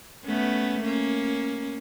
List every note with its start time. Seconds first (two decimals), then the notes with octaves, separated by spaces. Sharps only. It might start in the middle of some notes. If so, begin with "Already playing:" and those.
0.25 A3 B3 C#4
0.83 A#3 C#4